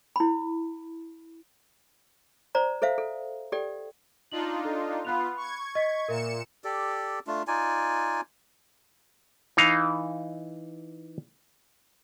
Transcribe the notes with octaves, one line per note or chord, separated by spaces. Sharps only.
E4 B5
C5 D5 A#5
A4 C5 E5 F5
A4
G4 A4 D5 G5
D4 D#4 F4 F#7
A4
B3 F4 B5 F#6 F7
C#6 G#6
D#5 B6
A#2 A#4 E5 C#7 E7
G4 A4 D5
A3 D4 F4
D#4 F4 D5 G#5
E3 D#4 F5